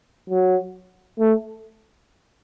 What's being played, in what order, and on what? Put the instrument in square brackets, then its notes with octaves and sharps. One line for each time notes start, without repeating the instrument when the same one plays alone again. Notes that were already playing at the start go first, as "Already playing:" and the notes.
[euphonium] F#3
A3